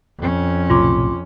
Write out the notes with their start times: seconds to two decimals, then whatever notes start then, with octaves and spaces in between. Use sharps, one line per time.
0.18 F2 C#4
0.70 B1 A2 C3 F4 C6 D6